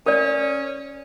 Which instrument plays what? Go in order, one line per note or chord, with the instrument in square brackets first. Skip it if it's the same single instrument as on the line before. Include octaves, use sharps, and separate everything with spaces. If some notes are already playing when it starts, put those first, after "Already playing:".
[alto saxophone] C#4 [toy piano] A#4 D5